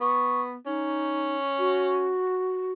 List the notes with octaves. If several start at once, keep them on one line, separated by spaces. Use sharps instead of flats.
B3 C#6
C#4 D#4
F#4